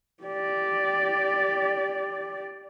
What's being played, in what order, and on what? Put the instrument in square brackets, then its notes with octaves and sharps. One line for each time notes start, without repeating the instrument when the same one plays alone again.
[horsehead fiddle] G4 D5